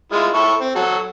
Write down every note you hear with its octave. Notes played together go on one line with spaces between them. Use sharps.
G#3 E4 F4
E4 A4 C#6
C4
F#3 F#4 A4